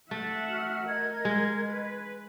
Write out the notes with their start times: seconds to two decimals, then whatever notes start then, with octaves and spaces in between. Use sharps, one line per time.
0.11 A3 E5 F#5
0.49 F#4 F6
0.87 A#4 D#5 G#6
1.25 G#3
1.69 B4